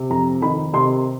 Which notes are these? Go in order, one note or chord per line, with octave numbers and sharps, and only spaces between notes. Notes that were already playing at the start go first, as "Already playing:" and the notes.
Already playing: C3
F2 A#5
D#3 B5
C3 C6